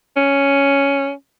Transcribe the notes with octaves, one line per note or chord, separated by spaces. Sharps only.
C#4